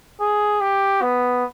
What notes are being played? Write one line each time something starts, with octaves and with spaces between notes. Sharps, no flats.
G#4
G4
B3